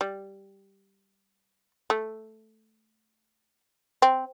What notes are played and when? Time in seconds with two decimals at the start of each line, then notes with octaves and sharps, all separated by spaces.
0.01 G3
1.90 A3
4.02 C4